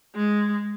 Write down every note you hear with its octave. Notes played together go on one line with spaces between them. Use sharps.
G#3